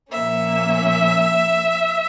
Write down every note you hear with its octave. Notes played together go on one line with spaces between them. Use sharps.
A#2 F3 A#3 C#4 E5